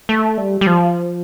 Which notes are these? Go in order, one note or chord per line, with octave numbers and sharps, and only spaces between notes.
A3
G3
G3
F3